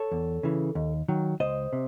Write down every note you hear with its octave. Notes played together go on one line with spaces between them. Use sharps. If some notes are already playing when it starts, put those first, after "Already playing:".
Already playing: A4 C#5
E2
C#3 E3
D#2
D#3 F#3
C#2 C5 D#5
C3